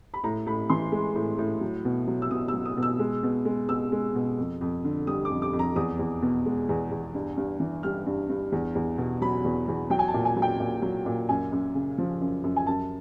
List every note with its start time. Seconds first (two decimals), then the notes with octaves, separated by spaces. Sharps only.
0.14 B5
0.24 A2 A#5
0.46 A2 B5
0.70 E3 C6
0.92 G#3
1.15 A2
1.39 A2
1.61 F#3
1.85 B2
2.07 F#3
2.22 E6
2.31 B2 D#6
2.48 E6
2.54 F#3
2.65 D#6
2.77 B2
2.83 E6
2.99 G#3
3.23 B2
3.45 G#3
3.69 B2 E6
3.92 G#3
4.15 B2
4.38 F2
4.61 F2
4.84 D3
5.07 G3 D#6
5.25 D6
5.30 F2
5.42 D6
5.53 F2
5.59 A#5
5.76 E2 D#6
5.99 E2
6.22 B2
6.46 G#3
6.69 E2
6.91 E2
7.14 G2
7.37 G2
7.60 E3
7.83 G3 F6
8.06 G2
8.29 G2
8.52 E2
8.75 E2
8.98 B2
9.22 F#3 B5
9.44 E2
9.68 E2
9.90 F#3 G5
9.99 G#5
10.08 A5
10.14 A#2
10.25 G#5
10.36 F#3
10.42 G5
10.60 A#2
10.82 F#3
11.06 A#2
11.29 F#2 G#5
11.52 F#2
11.75 C#3
11.98 F3
12.21 F#2
12.44 F#2
12.56 G#5
12.67 F#2 A5